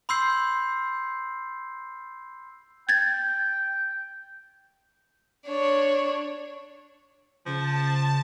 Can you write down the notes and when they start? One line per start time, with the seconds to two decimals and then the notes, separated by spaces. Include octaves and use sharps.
0.09 B5 C6 E6 G6 C7
2.89 G5 G#6 A6
5.47 D4 C#5
7.46 C#3 F3 A5